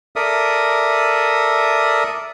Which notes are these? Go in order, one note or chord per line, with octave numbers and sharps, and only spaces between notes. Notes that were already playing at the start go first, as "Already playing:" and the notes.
A4 A#4 D5 E5 D#6